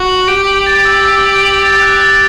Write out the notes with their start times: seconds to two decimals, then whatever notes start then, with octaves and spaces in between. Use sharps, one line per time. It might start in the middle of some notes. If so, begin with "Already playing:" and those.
Already playing: F#4
0.08 F#7
0.27 G4 D7
0.47 F#7
0.66 A6
0.85 E6
1.05 E6
1.25 D7
1.43 F#7
1.62 A6
1.82 F#6
2.01 A6